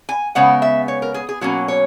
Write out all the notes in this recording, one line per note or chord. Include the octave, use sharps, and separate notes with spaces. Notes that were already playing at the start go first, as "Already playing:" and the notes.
G#5
C#3 G#3 B3 F#5
E5
C#5
A#4
G#4
G#4
B2 F#3 A#3 C#4 F#4
C#5